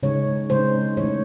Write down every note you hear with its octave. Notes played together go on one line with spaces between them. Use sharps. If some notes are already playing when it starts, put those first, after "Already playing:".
C#3 G#3 D#4 C#5
C#3 G#3 D#4 C5
E3 A3 D#4 C#5